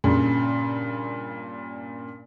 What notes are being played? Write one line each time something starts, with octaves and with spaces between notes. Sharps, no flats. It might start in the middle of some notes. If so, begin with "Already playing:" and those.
G2 A#2 C#3